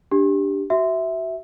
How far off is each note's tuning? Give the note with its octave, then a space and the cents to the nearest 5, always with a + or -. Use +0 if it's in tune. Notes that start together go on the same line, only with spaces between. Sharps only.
D4 +0 G4 +0
F#4 +25 E5 -5